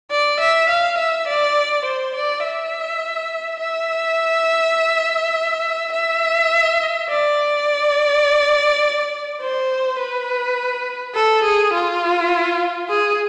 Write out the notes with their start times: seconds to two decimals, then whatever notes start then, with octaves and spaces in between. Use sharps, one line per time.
0.11 D5
0.40 E5
0.69 F5
0.98 E5
1.28 D5
1.85 C5
2.15 D5
2.44 E5
3.60 E5
5.92 E5
7.09 D5
9.41 C5
9.99 B4
11.15 A4
11.44 G#4
11.74 F4
12.90 G#4